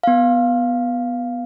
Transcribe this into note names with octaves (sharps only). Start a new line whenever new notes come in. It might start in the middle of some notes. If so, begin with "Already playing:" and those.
B3 F5